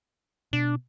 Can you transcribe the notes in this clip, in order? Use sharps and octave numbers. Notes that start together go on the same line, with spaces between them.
B2 D4